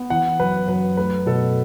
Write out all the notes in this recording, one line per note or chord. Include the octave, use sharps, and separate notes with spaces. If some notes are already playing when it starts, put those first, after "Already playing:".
Already playing: B3
E3 F#5
F#2 B4
F#2 B4
A3 B4
B2 A4